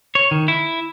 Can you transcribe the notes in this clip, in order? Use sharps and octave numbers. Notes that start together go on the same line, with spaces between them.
C#5
D#3
E4